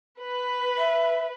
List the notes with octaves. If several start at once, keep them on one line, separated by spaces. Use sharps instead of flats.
B4
E5